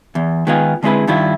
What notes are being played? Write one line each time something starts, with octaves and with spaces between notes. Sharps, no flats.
E2
D#3 G#3 B3 D#4 F4 G#4
D3 G#3 C4 E4 G#4 B4
G2 D#3 E4 F4